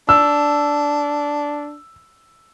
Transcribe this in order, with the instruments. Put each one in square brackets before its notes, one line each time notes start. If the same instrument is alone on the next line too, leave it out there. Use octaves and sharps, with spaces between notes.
[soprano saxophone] D4 [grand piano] E6